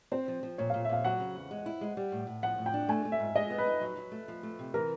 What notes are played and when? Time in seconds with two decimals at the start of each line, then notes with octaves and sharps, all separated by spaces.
0.12 C4 C5
0.28 F3
0.43 F3
0.58 A#2 C#5
0.70 A#2 F5
0.85 E5
0.89 A#2 F5
1.05 F#3 F#5
1.20 C#3
1.36 E2
1.51 G#3
1.66 E4
1.81 G#3
1.97 G3
2.12 A2
2.27 A2
2.43 F3 F#5
2.58 A2
2.66 G5
2.74 D4
2.88 A3 G#5
3.05 A3
3.12 E5
3.20 G#2
3.35 G#3 D#5
3.50 B3
3.58 B4
3.66 D#4
3.81 F#3
3.97 F#3
4.12 A3
4.28 F3
4.43 A3
4.59 C3
4.74 E3 A#4